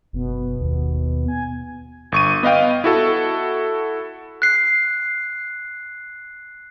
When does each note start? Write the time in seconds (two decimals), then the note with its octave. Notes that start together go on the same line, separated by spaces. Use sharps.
0.13 F#1 B2
0.61 D#2
1.28 G#5
2.12 G1 C#6 D#7
2.43 B3 D#5 F5 G5
2.84 E4 F#4 A4
4.42 F#6 C7